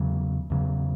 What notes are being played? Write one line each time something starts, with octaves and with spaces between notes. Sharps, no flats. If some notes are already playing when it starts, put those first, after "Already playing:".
Already playing: E2 C#3 F#3
E2 C#3 F#3